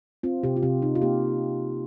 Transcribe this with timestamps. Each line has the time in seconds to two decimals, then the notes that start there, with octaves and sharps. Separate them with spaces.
0.23 C4 F4
0.43 C3 G4
0.56 F4
0.63 C3 G4
0.82 C3 D#4
0.95 F4
1.02 A#3 G4